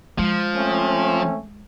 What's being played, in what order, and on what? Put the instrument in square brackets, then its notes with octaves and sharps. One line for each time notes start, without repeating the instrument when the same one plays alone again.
[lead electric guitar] F3 [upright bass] G#3
[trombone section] A3 C4 C#4